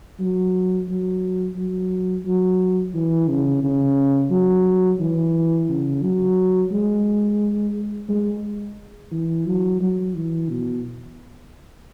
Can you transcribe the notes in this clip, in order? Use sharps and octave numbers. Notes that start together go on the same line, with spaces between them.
F#3
F#3
F#3
F#3
E3
C#3
C#3
F#3
E3
C#3
F#3
G#3
G#3
E3
F#3
F#3
E3
B2